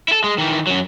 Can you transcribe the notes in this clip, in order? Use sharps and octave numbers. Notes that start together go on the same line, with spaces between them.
E4 A4
G#3
D#3 E3
F#2 F#3